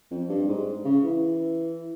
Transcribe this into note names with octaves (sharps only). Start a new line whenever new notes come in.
F2
G2
G#2
C#3
E3